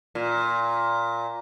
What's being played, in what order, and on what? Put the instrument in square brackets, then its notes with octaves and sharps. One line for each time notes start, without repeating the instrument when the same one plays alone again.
[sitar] A#2